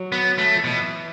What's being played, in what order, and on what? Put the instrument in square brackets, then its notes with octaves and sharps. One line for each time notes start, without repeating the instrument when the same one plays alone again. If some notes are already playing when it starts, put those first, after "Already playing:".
Already playing: [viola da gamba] F#3
[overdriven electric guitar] B3
A3
[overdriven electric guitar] B2 [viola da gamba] E3